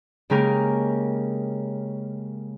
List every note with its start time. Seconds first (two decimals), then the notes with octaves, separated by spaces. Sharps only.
0.30 C#3 G#3 A#3 C#4 G4 A#4